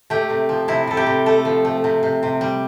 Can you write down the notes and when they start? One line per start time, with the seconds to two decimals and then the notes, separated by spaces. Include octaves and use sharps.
0.10 A3 G4
0.30 C3
0.49 F3
0.68 C3 E4
0.87 C3 A4
0.97 G4
1.07 C3
1.26 A3 A4
1.45 F3
1.65 A3
1.84 C3
2.03 C3
2.23 C3
2.41 G3